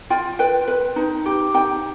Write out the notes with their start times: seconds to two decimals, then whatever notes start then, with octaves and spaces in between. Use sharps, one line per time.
0.10 F4 G5
0.39 B4 G5
0.68 B4
0.96 D#4
1.26 G4
1.54 D#4 G5